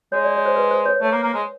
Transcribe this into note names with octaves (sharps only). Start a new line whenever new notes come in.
G#3 C#5
D5
C#5
C5
B4
C5
C#5
A3 C#5
A#3
A#3
G#3